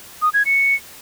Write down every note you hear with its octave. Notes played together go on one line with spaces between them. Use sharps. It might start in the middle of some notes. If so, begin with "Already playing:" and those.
D#6
G#6
C#7